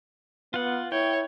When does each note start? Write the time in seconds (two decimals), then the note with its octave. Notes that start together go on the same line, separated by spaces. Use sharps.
0.54 B3 F4 F#5
0.92 E4 C#5 G5